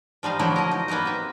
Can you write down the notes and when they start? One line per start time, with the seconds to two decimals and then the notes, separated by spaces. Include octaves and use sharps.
0.23 F3 G3 D#4 F5
0.39 D3 F3 F#3 A#3 E4
0.56 A#4 D#5
0.71 D#4
0.88 A#3 B3 D#4 A#4 D#5
1.05 C3 E5